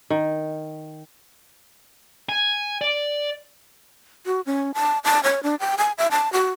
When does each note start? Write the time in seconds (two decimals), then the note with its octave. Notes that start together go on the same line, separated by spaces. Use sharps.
0.10 D#3
2.29 G#5
2.81 D5
4.26 F#4
4.46 C#4
4.74 A5
5.04 A5
5.23 C#5
5.43 D4
5.60 G5
5.78 G#5
5.98 E5
6.11 A5
6.33 F#4